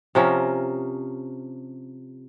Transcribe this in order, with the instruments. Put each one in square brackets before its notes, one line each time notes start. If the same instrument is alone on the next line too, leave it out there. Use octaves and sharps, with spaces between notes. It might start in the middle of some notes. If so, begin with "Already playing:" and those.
[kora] C3 F3 C#4 A#4